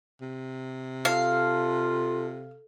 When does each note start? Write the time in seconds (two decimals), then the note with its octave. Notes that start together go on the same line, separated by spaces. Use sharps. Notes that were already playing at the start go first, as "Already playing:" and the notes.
0.21 C3
1.05 F4 A4 F5